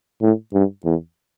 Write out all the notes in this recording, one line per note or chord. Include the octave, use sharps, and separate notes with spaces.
A2
G2
E2